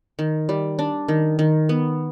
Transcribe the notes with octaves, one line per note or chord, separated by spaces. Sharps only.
D#3
G3
D4
D#3
D#3
B3